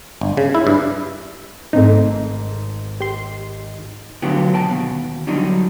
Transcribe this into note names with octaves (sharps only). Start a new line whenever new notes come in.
G1
C#3
E4
G2
G#1 G#2 A3 C4 D#4
G4 C6
D2 D3 F#3 B3 F4 G4
B2 G5 A5
D#2 B2
D3 F#3 G3 D4 D#4